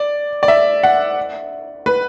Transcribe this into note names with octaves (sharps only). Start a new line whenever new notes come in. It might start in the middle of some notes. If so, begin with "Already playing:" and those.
Already playing: D5
D5
E5
F#5
B4